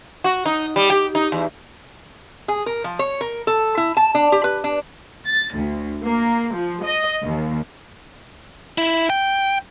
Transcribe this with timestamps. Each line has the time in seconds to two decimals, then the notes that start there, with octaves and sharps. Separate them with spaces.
0.24 F#4
0.46 D#4
0.76 G3
0.90 G4
1.15 D#4
1.32 E2
2.48 G#4
2.66 A#4
2.84 F3
2.99 C#5
3.21 A#4
3.47 A4
3.77 E4
3.97 A5
4.15 D4
4.32 G4
4.44 B4
4.64 D4
5.25 A6
5.58 D2
6.03 A#3
6.54 F3
6.83 D#5
7.22 D#2
8.78 E4
9.10 G5